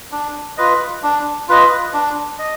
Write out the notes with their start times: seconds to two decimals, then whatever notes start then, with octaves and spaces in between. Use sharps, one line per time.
0.12 D4
0.57 F4 B4 D#5
1.03 D4
1.48 F4 B4 D#5
1.94 D4
2.39 D#5